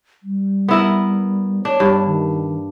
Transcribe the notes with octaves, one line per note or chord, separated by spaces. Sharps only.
G3
B3 E4 A#4
D4 C#5
G2
D#3